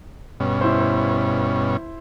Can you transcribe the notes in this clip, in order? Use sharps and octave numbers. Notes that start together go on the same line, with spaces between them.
G2 B2 C#4
E4 C5